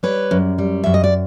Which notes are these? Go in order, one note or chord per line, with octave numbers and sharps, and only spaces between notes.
G3 B4 C#5
F#2
G3
F#2 E5
D#5
D5